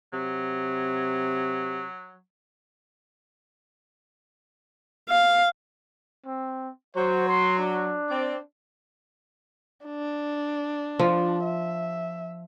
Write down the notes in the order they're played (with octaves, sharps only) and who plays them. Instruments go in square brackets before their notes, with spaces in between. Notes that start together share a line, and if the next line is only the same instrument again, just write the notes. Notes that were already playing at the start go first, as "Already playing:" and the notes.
[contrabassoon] C3 [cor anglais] F#3
[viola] F5
[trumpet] C4
[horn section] F#3 [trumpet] C5
[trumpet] C6
D4
[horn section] C4 D5
[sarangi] D4
[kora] F3
[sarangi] E5